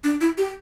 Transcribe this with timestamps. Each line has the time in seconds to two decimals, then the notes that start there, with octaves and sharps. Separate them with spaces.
0.04 D4
0.21 E4
0.38 G4